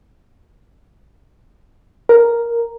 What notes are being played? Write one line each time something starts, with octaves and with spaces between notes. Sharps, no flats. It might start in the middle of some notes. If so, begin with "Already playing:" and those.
A#4